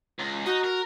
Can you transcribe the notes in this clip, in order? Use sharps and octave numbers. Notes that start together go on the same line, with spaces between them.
C#2
D#4 F#4
A#4